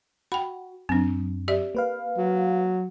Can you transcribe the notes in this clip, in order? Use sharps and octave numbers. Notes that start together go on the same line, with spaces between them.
F#4 G5 B5
F#2 C4 D4
G4 D5 E5
A#3 B4 F5
F#3